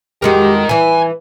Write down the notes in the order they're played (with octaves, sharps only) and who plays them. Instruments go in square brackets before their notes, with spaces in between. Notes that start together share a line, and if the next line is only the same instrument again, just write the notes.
[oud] F2 G#3 F#4 [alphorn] G4 [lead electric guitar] A#4 D#5
[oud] E3 E4 [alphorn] B4 [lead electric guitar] G#5